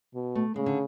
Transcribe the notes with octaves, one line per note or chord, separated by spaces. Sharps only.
B2
A3
C#3 G#3
D3